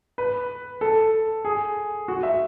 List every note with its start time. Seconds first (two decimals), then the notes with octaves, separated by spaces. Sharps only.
0.18 B4
0.81 A4
1.45 G#4
2.08 F#4
2.23 E5